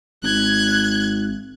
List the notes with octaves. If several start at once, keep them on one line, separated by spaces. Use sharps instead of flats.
G#1 F#6 G#6